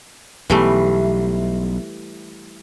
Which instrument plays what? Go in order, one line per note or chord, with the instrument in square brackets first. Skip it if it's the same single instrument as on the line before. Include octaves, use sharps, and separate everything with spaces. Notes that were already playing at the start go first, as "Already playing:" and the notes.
[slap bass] B1 B2 [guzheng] E3 G3 A3